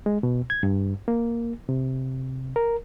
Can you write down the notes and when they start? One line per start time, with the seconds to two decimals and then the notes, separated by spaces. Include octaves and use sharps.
0.06 G#3
0.23 B2
0.50 G#6
0.63 G2
1.08 A#3
1.69 C3
2.56 A#4